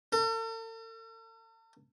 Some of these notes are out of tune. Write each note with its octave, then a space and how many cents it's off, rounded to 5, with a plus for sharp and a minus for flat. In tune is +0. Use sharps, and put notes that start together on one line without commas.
A4 +45